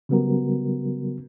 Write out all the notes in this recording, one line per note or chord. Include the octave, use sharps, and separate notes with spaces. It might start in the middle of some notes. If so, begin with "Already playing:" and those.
C#3 F#3 G3 B3 F#4 A#4